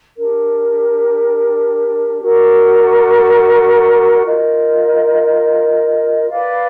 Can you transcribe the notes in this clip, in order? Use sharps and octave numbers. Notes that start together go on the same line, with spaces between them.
D4 G4 A#4
F#4 A#4 D5
F4 A#4 D#5
B4 D5 F5